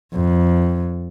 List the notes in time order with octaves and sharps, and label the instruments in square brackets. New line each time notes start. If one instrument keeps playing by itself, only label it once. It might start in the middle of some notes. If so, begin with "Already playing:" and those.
[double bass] F2